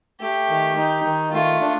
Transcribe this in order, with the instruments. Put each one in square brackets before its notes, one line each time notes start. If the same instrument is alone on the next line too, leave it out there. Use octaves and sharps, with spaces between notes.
[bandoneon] A3 [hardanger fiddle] G4
[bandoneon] D#3
D#4
D#3
[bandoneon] A3 [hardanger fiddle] F4
[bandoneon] D4